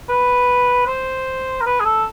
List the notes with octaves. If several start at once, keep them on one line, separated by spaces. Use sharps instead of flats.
B4
C5
A#4
B4
G#4
A4